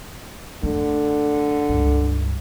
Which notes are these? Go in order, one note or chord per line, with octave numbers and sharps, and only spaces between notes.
F#2 D3 A3
C#2 G2